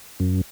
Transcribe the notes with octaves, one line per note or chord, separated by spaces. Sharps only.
F#2